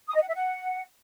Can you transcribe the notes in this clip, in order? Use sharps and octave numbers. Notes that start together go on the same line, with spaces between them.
D#6
D#5
F#5
E5
F#5